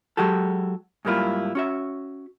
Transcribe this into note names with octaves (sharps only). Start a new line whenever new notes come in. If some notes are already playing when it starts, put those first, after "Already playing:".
F#3 G#3 F#4 G4 A4
G#2 F#3 G3 A#3 E4 F4
C#4 F#4 E5